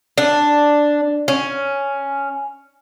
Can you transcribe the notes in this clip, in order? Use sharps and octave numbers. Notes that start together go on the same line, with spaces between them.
D4
C#4